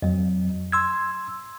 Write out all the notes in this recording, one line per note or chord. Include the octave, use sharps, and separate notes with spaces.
F2 F#3
C6 E6 G#6